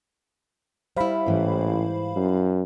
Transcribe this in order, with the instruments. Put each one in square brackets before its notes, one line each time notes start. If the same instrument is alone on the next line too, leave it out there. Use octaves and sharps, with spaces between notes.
[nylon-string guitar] G3 E4 [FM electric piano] C5 F5 B5
[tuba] A1 [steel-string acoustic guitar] G#2 E3
[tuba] F#2